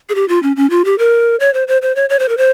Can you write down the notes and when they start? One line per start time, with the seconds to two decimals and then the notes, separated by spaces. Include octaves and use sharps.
0.09 G#4
0.15 G4
0.28 F4
0.43 C#4
0.56 C#4
0.70 F4
0.85 G4
0.98 A#4
1.40 C#5
1.54 C5
1.68 C5
1.82 C5
1.96 C#5
2.10 C#5
2.19 C5
2.29 A#4
2.37 C5